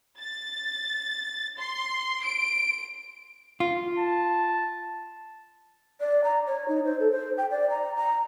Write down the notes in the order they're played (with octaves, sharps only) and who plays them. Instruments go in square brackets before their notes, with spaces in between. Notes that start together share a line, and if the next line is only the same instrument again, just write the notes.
[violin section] A6
C6
D7
[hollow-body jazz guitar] F4
[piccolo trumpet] A5
[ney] D5
A#5
C#5
D#4
C5
A4
C5
G5
D5
A#5
A#5